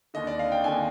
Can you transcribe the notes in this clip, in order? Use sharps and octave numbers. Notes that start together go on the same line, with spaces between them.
D#2 D3 D#5
D5
F5
G5
D#2 D3 G#5